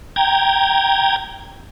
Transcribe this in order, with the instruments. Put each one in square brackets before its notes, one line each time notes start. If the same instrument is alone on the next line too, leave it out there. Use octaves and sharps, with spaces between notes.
[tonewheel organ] G5 A#5 G#6